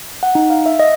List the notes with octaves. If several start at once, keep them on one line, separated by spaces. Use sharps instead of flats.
F#5
D#4
F5
E5
D#5